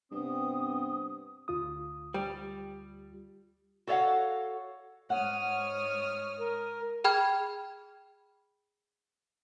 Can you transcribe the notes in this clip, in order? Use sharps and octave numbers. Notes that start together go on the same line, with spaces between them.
G2 C3 B3 C4 D#6
D2 F4 D#6
G3
F#4 A4 C#5 D#5 F5 F#5
G#2 C#5 F#5 D#6 F6
A#4
G#4 G5 B5 F6 G#6